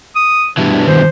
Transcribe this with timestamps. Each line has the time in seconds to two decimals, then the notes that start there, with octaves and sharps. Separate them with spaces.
0.16 D#6
0.57 G2 B2 E3 D4
0.87 D#3 C5